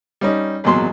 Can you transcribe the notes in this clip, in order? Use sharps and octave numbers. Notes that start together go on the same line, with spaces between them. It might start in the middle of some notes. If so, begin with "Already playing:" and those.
G3 C#4 D#4
G#1 E2 A#2 F#3 C6